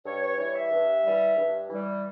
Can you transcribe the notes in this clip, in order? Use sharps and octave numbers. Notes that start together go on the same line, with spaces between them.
G2 C#5
C#5
E3 G3 C#5
E5
G2
E3 G3
G2
E3 G3